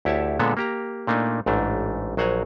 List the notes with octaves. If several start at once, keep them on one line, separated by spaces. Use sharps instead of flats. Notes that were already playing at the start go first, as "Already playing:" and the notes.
D2 E4 G4 C#5 E5 A5
A#2 D3 G#3 B3 A4 C#5
A#3 G4 A#5
A#2 A3 A#3 D4 D#4
A1 G#2 A3 D4
A#1 F#3 C5 F#5 G#5 A#5